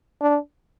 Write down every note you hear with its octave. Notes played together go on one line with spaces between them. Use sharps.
D4